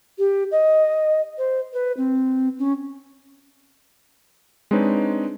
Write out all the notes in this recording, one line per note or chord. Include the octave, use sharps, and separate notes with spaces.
G4
D#5
C5
B4
C4
C#4
G#3 C4 D4 D#4 B4 C#5